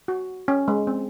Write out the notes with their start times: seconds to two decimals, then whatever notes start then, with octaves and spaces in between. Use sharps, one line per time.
0.08 F#4
0.48 C#4
0.68 G#3
0.87 C4